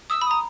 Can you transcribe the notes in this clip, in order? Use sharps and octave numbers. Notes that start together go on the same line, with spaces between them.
D#6 E6
B5
A#5 D#6